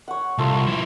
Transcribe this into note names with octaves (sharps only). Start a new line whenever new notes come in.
C#5 F#5
C2 A3 F4
F3 E4